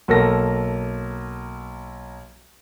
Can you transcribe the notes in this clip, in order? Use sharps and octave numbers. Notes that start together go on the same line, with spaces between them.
B1 A#3 A4 A#6